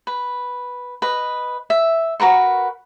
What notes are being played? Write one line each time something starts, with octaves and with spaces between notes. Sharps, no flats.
B4
B4 D#5
E5
F#4 A#4 B4 C#6